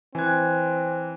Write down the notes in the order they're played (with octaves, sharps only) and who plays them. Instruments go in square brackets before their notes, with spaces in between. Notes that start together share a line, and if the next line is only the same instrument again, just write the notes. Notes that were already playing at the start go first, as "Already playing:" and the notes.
[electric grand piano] E3 G#6 [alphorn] C4 [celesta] G#5 F#6